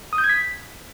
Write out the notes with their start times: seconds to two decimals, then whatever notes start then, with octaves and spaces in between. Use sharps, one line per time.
0.13 D#6
0.18 G6
0.24 G#6
0.29 B6